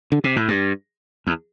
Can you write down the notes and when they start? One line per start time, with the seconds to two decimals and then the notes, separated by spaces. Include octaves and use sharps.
0.12 D3
0.24 C3
0.36 A2
0.48 G2
1.27 E2